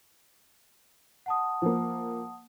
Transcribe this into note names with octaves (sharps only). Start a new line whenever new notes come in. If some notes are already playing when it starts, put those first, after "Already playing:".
F#5 A5 D#6
F3 A#3